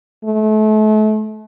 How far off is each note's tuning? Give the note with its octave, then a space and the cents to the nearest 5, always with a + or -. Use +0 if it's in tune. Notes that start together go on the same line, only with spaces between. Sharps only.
A3 -35